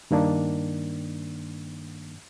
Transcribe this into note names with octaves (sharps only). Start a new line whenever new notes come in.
G2 D#3 A#3 D4